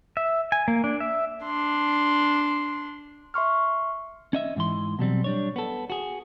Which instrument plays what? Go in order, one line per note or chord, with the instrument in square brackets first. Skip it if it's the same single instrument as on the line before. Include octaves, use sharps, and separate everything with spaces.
[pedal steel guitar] E5
G#5
A#3
D4
E5
[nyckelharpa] D4 C6
[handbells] E5 C6 C#6 F6
[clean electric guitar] C#4 D#5 E5
G#2 E3 C6
B2 F#3 G3 C4
G3 D4 C#5
B3 A4
F#4 G#4